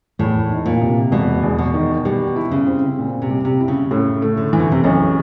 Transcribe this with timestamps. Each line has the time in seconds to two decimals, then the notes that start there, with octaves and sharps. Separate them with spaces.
0.19 E2 A2
0.50 D#3
0.66 A#2
0.82 C3
1.12 E1 B2
1.43 E2
1.58 B2
1.74 D#3
2.05 B2 G3
2.36 E4
2.51 C#3
2.66 C4
2.99 A#2
3.22 C3
3.30 G3
3.45 C3
3.60 E4
3.68 C#3
3.91 A2 C#3
4.22 A3
4.37 D3
4.53 E3
4.59 B2
4.72 C3
4.84 B1 C#3